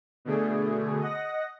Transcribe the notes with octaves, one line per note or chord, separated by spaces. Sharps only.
B2 D3 A3 G#4
D#5 F#5 A#6